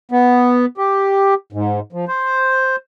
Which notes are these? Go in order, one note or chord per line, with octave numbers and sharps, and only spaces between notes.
B3
G4
G#2
F3
C5